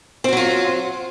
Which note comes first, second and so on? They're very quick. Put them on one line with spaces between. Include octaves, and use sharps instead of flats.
C4 F#4 F#3 F4